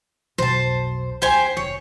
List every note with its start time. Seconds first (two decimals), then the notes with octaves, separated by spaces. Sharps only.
0.38 B1 F2 C5 A5
1.22 D2 G4 C5 G#5
1.57 F1 C#5